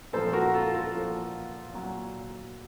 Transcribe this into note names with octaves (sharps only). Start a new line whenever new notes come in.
A#2 F3 A4 C5
F#4 A#4
F4 A4
F4 A4
A#2 F3
A#2 F#3